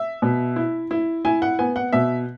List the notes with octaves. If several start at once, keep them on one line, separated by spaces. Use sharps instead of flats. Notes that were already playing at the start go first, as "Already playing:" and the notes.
Already playing: E5
B2
E4
E4
E4 G#5
F#5
B3 G#5
F#5
B2 E5